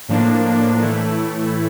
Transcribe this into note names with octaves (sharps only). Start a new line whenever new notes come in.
A2 F3 A#3 D4
A2 E3 A3 E4